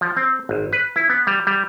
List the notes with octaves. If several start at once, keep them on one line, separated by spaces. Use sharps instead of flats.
F3
C4
G#1
B4
E4
B3
G3
G3